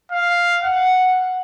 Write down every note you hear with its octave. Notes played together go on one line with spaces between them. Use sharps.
F5
F#5